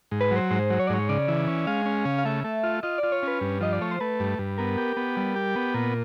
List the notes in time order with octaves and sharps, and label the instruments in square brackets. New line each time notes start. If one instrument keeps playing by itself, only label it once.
[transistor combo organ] G#2
[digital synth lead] B4
[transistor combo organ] F#3
[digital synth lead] C5
[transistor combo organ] G#2 [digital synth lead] C5
[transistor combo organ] F#3
[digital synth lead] C#5
D5
[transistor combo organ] G#2 [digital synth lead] C#5
[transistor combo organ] C#3 [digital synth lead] D5
[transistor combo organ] E3
C#4
[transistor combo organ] G#3 [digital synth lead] F5
[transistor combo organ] C#4
C#3
[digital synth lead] F5
[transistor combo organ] A3 [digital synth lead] E5
[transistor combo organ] A3
F4
[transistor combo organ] F4 [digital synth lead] D#5
[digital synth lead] D5
[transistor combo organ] F4
[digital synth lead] C#5
[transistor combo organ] C#4 [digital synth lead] B4
[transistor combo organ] G2
[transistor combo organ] F3 [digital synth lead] D#5
[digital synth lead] D5
[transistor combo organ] A3 [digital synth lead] C#5
[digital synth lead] C5
[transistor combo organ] A3 [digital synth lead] B4
[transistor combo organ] G2
G2
[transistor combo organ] B3 [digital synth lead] A#4
[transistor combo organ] G4
B3
G3
G4
B3
[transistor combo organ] A#2 [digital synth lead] A#4